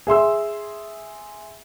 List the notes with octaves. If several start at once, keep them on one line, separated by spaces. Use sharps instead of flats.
G#4 E5 C6 E6